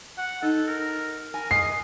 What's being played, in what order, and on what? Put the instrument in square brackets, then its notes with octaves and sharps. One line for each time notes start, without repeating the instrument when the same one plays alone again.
[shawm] F#5
[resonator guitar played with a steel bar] D#4 [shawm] A4
[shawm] A#4
[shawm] A#4 [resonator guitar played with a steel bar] G#5
[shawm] D#5 [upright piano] C7